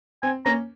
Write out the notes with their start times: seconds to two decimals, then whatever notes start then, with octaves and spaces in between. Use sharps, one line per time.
0.22 C4 G#5
0.45 A#3 C#4 A#5